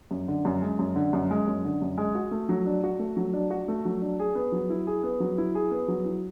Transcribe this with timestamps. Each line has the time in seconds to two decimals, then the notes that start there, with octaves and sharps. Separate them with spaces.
0.11 F#2
0.28 D3
0.45 F#2
0.62 G#3
0.79 F#2
0.96 D3
1.13 F#2
1.31 G#3
1.47 F#2
1.65 D3
1.82 F#2
1.98 G#3
2.15 F#4
2.31 A3
2.49 F#3
2.66 D4
2.84 F#4
2.99 A3
3.17 F#3
3.33 D4
3.50 F#4
3.68 A3
3.85 F#3
4.02 D4
4.20 G#4
4.35 B3
4.52 F#3
4.70 E4
4.87 G#4
5.03 B3
5.20 F#3
5.38 E4
5.55 G#4
5.71 B3
5.88 F#3
6.06 E4